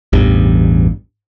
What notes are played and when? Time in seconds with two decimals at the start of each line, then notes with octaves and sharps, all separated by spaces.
0.13 A1 E2 G2